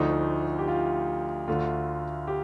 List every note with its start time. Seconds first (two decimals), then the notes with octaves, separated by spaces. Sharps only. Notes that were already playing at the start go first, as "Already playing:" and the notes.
Already playing: D2 D3 F3 A3 D#4
0.59 G4
0.68 F4
1.48 D2 D3 A3 F4
2.27 G4